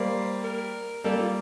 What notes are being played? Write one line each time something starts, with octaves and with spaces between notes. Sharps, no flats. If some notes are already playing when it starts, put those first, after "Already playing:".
Already playing: G3 A#3 C5
A#4
G3 A#3 A4
F4